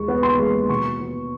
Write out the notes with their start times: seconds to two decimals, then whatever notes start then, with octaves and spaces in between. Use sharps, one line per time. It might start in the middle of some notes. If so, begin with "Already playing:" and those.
Already playing: D#2 D#3 G#3 C#6
0.08 B3
0.23 C6
0.39 G#3
0.69 B2 C#6
1.01 B3